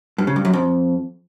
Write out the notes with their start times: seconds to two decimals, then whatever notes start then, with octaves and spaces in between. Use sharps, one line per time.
0.18 G2
0.27 C#3
0.36 G2
0.45 F#2
0.53 F2